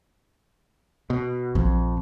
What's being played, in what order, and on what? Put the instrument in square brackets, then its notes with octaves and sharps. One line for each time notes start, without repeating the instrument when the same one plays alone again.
[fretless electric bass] B2
[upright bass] A#1 [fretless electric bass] F2